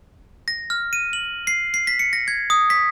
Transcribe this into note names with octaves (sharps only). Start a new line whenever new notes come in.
A#6
F6
D#7
F#7
C7
C7
B6
C#7
A#6
G#6
D#6
B6